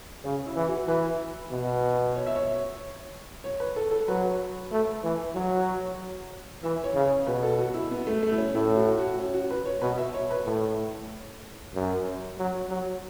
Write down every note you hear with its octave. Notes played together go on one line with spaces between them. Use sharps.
C#3 C#4
E4
E3
F#4
E3 B4
B2
C#5
E5
C#5
C#5
B4
A4
A4
F#3 B4
A3
E3
F#3 C#5
E3 E5
C#5
C#3
C#5
B2 B4
A4
F#4
E4
B3
A3
A3
E4
C#4
A2 E4
F#4
F#4
C#4
F#4
B4
C#5
B2 B4
E5
C#5
B4
A2 C#5
F#2
F#3
F#3